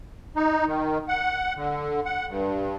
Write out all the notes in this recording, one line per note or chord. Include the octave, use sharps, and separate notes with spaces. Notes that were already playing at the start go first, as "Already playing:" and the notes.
D#4
D#3
F#5
D3
F#5
G2